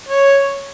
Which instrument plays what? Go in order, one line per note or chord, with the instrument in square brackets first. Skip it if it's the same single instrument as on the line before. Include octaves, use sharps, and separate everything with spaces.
[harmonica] C#5